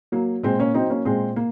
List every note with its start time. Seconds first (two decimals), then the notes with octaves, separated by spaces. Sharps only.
0.12 F#3 A#3
0.43 A#2 G#3 C4
0.59 A#3 C#4
0.74 F#3 C4 D#4
0.90 A#3 C#4
1.05 A#2 G#3 C4
1.36 A#3